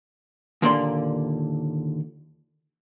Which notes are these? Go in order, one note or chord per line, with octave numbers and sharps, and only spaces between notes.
D#2 A#2 D3 A#3 D5 C6